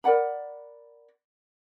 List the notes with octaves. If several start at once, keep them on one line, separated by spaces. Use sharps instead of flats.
A#4 D5 F#5 B5